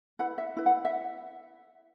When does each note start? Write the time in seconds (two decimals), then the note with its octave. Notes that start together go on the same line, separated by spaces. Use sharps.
0.19 E4 B4 F#5
0.38 E5
0.57 E4 B4
0.66 F#5
0.85 E5